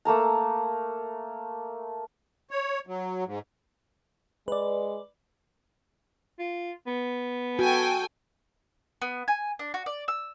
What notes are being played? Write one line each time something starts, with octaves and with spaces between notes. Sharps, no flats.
A3 A#3 A4 A#5
C#5
F#3
G#2
G#3 B4 D5
F4
B3
F#4 A4 G5 G#5
B3
G#5
D4
F#4
D5
E6